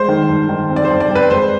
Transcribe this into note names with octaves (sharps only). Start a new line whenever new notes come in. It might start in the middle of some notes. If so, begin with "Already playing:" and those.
Already playing: G#3 C5
D#3
G2
D#3
C4
D5
C5
G2
D5
C4 B4
G#3 C5